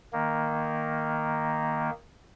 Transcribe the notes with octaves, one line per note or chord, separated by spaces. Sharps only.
D#3 A#3